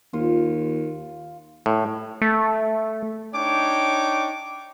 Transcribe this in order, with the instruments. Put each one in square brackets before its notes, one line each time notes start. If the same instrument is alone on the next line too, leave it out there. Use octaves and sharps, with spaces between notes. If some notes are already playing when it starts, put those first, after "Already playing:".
[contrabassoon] D#2 [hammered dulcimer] F4
[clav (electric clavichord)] A2
[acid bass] A3
[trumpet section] D4 D#4 C#5 G5 D6